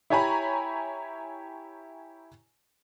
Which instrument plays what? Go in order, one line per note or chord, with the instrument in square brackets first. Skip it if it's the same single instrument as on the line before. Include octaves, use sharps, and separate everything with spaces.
[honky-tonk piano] E4 G4 C#5 G#5 A#5 B5